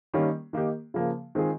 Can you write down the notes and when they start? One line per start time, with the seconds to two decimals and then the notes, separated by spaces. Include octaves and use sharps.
0.14 D#3 G3 A#3 C#4
0.53 D#3 A#3 D#4 G4
0.94 C#3 F3 A#3
1.35 D#3 G#3 C4 F4 G#4